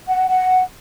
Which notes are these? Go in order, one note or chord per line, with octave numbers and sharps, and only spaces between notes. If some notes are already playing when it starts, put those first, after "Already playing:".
F#5
F#5